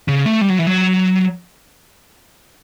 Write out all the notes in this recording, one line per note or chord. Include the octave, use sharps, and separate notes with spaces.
C#3
A3
G3
F#3
E3
F#3